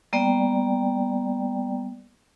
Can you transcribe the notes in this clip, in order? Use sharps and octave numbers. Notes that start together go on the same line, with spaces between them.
G3 A#3 B3 D5 G5